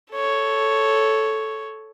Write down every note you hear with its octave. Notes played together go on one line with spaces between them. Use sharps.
A4 C#5